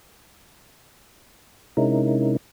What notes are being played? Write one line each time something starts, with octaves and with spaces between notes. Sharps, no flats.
C3 G#3 C#4 D#4 E4 A#4